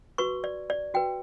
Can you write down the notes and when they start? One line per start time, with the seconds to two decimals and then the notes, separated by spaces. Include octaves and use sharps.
0.18 F#4 B4 C#6
0.44 D5
0.70 D5
0.94 F#4 B4 G5